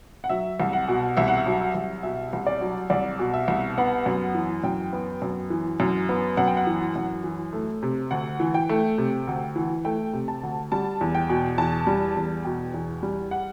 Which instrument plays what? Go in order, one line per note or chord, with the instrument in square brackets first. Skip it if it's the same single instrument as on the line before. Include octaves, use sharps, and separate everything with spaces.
[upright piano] F#5
F#3 E5
C2
F#5
B2
C2 E5
F#5
E5
F#3
E5
C2
B2 E5
C2
D5
F#3
C2 D5
B2
E5
C2
B3 F#5
F#2
E3
F#2 G5
B3
F#2
E3
F#2
B3
F#2 F#5
G5
F#5
E3
F#2
E3
A3
C3
D2 F#5
E3
G5
A3
C3
D2
E3
A3 G5
C3
A5
D2
G3 A5
E2
G5
B2
E2 A5
G3
E2
B2 G5
E2
G3
F#5